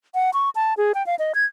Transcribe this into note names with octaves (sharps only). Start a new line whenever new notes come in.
F#5
C#6
A5
G#4
G5
F5
D#5
G#6